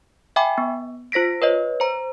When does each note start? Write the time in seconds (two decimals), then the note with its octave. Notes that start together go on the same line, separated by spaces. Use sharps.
0.36 E5 G5 G#5 B5 D6
0.58 B3
1.12 F4 C5 A#6 B6 D7
1.42 B4 C#5 D#5
1.80 C5 A#5